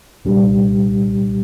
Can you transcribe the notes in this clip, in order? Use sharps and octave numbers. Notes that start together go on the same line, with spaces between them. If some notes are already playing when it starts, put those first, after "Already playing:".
C2 A#2 G3 D4 G4